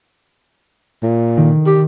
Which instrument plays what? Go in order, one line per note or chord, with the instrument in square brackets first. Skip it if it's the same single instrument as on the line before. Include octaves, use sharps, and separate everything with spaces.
[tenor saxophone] A#2
[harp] D#3
[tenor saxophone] G4